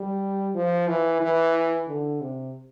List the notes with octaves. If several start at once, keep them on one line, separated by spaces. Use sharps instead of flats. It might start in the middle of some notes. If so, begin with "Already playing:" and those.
Already playing: G3
F3
E3
E3
D3
C3